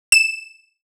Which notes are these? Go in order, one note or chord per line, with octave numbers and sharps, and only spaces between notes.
E7